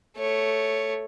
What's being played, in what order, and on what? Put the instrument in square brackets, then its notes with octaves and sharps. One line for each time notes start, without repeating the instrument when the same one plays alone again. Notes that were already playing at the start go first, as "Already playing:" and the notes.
[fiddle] A3 C#5